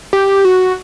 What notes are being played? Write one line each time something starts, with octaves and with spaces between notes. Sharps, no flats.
G4
F#4